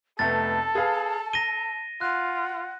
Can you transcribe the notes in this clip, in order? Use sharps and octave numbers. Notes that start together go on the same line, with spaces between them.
F1 A3 B3 A4 A5 A6
G#4 B4 F5
A#6 D#7 G7
F4 F#5 F#6